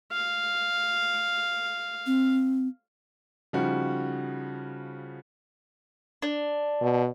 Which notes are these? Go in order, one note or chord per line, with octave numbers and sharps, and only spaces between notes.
F5
C4
C#3 F3 G3 D#4 F#4
D4
B2